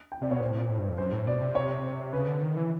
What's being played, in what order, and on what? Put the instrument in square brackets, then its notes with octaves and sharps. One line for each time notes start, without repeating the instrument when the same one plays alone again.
[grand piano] G5
[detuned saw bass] C3 [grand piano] D5
[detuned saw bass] B2 [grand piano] C#5
[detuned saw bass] A#2 [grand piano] C5
[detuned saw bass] A2
A#2
A2
G2
F2
[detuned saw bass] F#2 [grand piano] C5
[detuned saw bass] A2
[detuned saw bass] B2 [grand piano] D5
[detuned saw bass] C3
[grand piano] C#5
[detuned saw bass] C#3 [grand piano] B4
[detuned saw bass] D3
D#3
E3